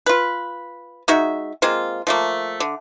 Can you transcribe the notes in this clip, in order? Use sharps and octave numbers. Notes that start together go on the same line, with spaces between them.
F4 B4
G#3 D#4 F#4 E5
G#3 A#3 C4 F4
F3 A3 A#3
D3